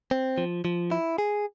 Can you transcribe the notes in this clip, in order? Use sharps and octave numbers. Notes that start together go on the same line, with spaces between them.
C4
F3
F3
E4
G#4